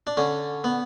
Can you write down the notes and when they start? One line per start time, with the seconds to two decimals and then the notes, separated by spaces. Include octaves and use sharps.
0.07 D4
0.17 D3 C#4
0.64 B3